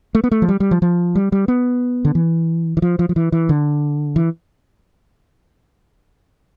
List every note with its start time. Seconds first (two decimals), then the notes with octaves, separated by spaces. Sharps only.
0.15 A3
0.24 B3
0.31 A3
0.42 F3
0.49 G3
0.60 G3
0.71 F3
0.82 F3
1.15 G3
1.32 G3
1.48 B3
2.05 D3
2.15 E3
2.77 E3
2.82 F3
2.99 F3
3.09 F3
3.16 E3
3.32 E3
3.49 D3
4.16 E3